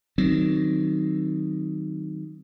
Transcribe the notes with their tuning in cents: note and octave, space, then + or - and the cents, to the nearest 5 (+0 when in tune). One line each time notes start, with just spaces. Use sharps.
D#3 +0 F#3 +20 C4 +0